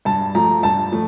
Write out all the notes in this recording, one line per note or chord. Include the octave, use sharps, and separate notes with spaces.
G2 A5
F3 A3 A#5
G2 A5
F3 A3